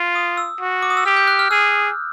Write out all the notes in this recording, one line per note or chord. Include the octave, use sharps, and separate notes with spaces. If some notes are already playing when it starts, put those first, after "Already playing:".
Already playing: F4
D#6
E6
F#4
D6
D#6
E6
G4 F6
G6
F#6
F6
G#4 E6